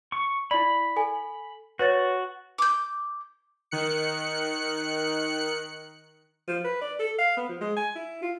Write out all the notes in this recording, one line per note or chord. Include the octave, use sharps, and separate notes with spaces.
C#6
E4 D5 B5
A4 G#5
F#4 B4 C#5 A6
D6 G6
D#3 F#6 C#7
F3
B4
D5
A4
F5
B3
F3
G#3
G#5
E4
F4